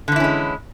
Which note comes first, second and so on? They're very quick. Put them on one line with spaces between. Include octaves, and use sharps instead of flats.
D3 E3 E4 C#4 G#3